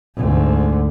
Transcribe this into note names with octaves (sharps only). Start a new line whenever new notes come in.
D2 G#2